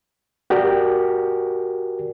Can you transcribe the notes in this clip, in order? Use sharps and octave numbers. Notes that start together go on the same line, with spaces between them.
F#4 G4 A#4 D5